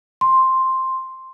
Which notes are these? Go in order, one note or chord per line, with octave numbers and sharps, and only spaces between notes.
C6